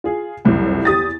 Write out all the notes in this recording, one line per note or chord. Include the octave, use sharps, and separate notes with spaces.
F4 G#4
F#1 C2 F2
E2 G4 D#6 A6